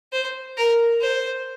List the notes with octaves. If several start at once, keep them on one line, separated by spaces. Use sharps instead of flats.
C5
A#4
C5